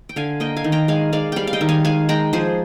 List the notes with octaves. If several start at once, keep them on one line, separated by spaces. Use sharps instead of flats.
G5
D3 F5 G#5
A#3 D#5 G5
F5 G#5
D#3
G5 A#5
G#3 F5 G#5
G#3 D5 F5
G3 D5 F5 G5
F5
D#5 G5
D#3
F5 G#5
G#3 F5 G#5
G#3 G5 A#5
F3 G#4 C5